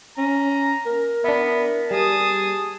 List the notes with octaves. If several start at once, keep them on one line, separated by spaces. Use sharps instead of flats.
C#4 A#5
A#4
B3 D4 E4
G3 G#4 A5 D#6